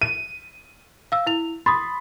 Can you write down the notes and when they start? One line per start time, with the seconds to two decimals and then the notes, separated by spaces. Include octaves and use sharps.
0.02 D#7
1.12 F5 E6
1.27 E4 F7
1.66 B5 C6 D#6 A6